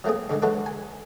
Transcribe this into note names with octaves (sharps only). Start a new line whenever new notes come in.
F#3 A3 A#3 C4 G#4
G2 D3 D#3 G#3
E3 F#3 G#3 F#4 A4 B4
G#5